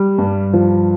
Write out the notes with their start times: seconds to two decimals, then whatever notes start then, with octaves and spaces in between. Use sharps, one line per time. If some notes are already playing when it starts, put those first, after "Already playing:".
Already playing: G3
0.18 G2
0.53 F3